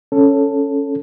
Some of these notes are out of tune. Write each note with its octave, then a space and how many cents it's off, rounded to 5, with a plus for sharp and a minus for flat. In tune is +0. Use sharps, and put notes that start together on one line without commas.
C#4 +0 A4 +5